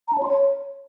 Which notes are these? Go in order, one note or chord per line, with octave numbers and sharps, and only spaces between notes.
A#5
A5
C#5
C6
C#5